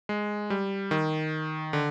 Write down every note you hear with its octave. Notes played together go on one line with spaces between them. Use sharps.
G#3
G3
D#3
D3